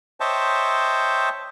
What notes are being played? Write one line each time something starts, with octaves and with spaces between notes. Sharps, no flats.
C5 C#5 D#5 E5 G5 A5